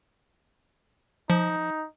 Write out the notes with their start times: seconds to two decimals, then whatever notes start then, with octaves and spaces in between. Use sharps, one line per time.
1.30 F3 D#4